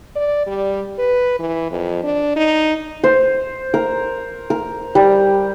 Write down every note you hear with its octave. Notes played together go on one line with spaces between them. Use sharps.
D5
G3
B4
E3
F2
D4
D#4
C5
A#4
A#4
G3